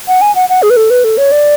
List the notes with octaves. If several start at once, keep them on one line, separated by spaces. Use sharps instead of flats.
F#5
G#5
F#5
F#5
G#4
B4
A4
B4
A4
C#5
D5